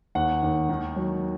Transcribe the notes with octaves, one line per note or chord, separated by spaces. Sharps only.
D#2 F#5
D#2
D#3
F#3